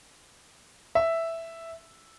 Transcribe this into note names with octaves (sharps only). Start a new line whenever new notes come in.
E5